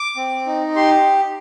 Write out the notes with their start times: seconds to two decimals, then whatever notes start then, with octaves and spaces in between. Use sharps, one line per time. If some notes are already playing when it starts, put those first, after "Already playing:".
Already playing: D6
0.17 C4
0.46 D#4
0.76 G4 C6